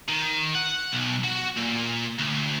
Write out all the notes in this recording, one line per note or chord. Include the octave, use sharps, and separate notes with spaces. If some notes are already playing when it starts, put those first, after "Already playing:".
D#3
F#5
B1
F#4
A#2
D2